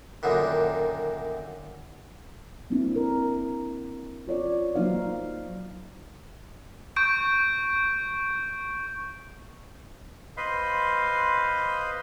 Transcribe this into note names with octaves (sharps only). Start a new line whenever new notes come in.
F#2 A#2 D3 D#3
A#3 C4 D4 E4
A#4
F4 C#5 D5
F#3 A#3 D#4 C5 F5
C#6 G6 D7
B4 C5 D#5 F5 B5 C6